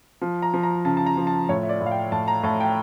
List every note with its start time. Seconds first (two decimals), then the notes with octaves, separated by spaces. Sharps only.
0.22 F3
0.42 A#5
0.54 F3
0.63 A#5
0.85 C#3 A5
0.97 A5
1.06 A#5
1.17 F3
1.27 A5
1.49 A2 C#5
1.63 E5
1.69 D5
1.81 A2
1.86 F5
1.91 G5
2.12 A2 A5
2.28 A#5
2.43 A2 A5
2.60 G5